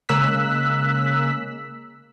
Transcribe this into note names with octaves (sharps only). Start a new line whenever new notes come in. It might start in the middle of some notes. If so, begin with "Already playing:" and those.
C#3 G#3 A#3 E6 F#6 B6